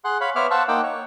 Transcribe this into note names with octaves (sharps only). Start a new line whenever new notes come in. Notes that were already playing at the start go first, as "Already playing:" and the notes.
G#4 F#5 C6 F#6
C#5 F5 B5
B3 C5 C#5 E5 D6 F6
C5 F5 F#5 A5 C#6 E6
A#3 D#4 F#5 G5 D6 E6
C#5